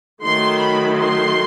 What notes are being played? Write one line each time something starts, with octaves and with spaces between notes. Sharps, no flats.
D#3 F#3 A3 C6
B5
C6